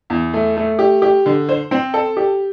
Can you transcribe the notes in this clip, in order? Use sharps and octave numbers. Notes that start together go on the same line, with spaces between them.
E2
A3
A3
G4
G4
D3
C5
C4
A4
G4